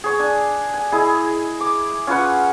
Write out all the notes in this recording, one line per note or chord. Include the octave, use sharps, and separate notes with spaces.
G#4 C#5
D4 G#5
G#5
E4 G#4 D#5
D6
C#4 F4 B4 F#5